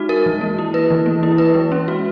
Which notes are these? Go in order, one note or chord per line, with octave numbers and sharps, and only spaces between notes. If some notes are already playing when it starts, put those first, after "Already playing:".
Already playing: G#3 D#4 F#4
A#4
E3
A#3
E4
B4
E3
A#3
E4
B4
G#3
C#4
F#4